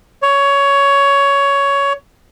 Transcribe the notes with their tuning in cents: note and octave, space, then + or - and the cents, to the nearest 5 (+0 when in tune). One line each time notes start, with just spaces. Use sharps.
C#5 +15